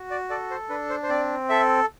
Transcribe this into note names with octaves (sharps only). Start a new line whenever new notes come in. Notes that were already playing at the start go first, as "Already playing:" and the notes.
Already playing: F#4
D5
A4 D5
C5
D4 B4
C5
C5
C4 D5
A4 E5